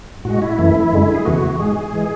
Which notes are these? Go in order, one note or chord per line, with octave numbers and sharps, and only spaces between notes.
A2 G#3 F#4
E4
F#2 E3 A3
F#2 D3 G#3
G#4
E2 C#3 E3 A3 F#4
G#2 G#3 G#4
E3 G#3